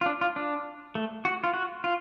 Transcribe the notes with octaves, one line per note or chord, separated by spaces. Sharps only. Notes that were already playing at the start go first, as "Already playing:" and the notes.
F4
D4
F4
D4
A3
F#4
F4
F#4
F4